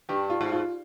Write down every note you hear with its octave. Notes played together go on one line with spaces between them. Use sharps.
G2 G4
F4
G#2
F4